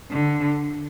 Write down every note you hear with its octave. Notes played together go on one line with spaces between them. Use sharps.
D3